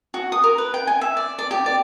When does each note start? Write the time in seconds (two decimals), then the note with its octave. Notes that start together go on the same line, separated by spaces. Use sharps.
0.14 F#4
0.32 D#6
0.44 A#4
0.58 B4
0.74 G5
0.87 G#5
1.01 E5
1.17 D5
1.39 D5
1.51 G4
1.66 D5